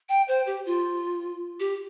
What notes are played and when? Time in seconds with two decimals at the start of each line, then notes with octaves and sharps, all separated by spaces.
0.09 G5
0.28 C5
0.47 G4
0.66 F4
1.60 G4